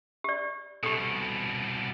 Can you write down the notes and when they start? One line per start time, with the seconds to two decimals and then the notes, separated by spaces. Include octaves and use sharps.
0.24 G4 D5
0.83 C2 B2 G4 A4